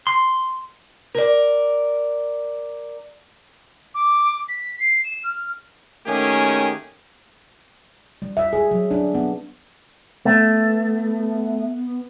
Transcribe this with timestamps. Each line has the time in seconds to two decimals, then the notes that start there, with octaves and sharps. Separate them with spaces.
0.07 C6
1.15 A#4 D5
3.95 D6
4.49 B6
4.80 C7
5.04 E7
5.24 F6
6.06 D#3 A3 A#3 C#4 G4 G#4
8.22 G3
8.37 E5
8.53 G#4
8.71 F#3
8.91 D4
9.14 B3
10.25 A3 B3